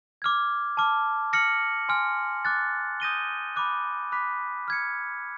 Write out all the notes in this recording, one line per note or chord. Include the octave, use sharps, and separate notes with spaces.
D6 F6 G#6
A5 D6 F6
F6 A#6 C#7 F#7
G#5 C6 F6
D6 F#6 A6
D#6 G6 A#6 D#7 G7
B5 D6 F#6
B5 D6 F#6 B6
F6 G#6 C#7